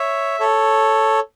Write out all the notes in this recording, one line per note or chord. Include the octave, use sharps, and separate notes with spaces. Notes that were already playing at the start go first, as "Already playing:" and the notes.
Already playing: C#5 E5
A4 C#5